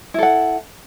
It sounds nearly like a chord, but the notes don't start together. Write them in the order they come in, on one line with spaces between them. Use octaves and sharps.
E4 A4 F#5